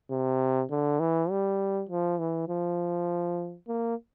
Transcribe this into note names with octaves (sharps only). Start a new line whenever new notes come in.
C3
D3
E3
G3
F3
E3
F3
A#3